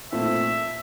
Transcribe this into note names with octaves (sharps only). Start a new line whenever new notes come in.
A#2 A3 C4 E5